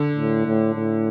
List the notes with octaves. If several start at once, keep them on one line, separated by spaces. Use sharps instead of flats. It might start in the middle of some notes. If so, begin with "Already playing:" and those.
Already playing: D3
A2
A2
A2